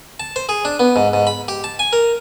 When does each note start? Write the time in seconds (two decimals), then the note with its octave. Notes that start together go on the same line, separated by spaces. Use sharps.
0.20 A5
0.36 C5
0.49 G#4
0.65 D4
0.80 B3
0.96 G#2
1.13 G#2
1.27 B5
1.48 G4
1.64 A5
1.79 G#5
1.93 A#4